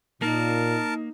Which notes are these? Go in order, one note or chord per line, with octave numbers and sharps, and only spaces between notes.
A#2 A#3 D#4 A#4 A5